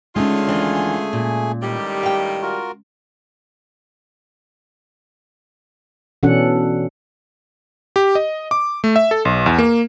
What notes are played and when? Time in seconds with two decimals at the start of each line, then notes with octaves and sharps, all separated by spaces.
0.16 D3 G#3 A3 C#4 D#4 F4 G#4 G#5
0.47 D#2 E3 D4
1.13 A#2
1.63 A2 D#3 G3 G4
2.03 F5 G5
2.42 F4 F#4 A#4
6.23 B2 E3 C#4 D4 A4 F#5
7.96 G4
8.15 D#5
8.51 D6
8.84 A3
8.96 E5
9.11 A4
9.25 B1
9.46 E2
9.58 A#3